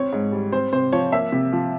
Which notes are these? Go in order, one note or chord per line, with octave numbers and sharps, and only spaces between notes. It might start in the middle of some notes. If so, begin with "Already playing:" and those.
Already playing: C4 C#5
G#2
G3
C4 C5
C3 C5
F3 C#5
A#3 E5
C3
F3